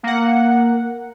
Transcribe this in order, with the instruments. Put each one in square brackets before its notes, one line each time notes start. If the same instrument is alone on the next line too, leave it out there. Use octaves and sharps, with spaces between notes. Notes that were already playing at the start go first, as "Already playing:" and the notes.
[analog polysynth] A#3 F#5